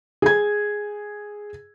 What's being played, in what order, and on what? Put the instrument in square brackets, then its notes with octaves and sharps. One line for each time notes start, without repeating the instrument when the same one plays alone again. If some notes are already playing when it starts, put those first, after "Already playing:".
[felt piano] G#4 G#6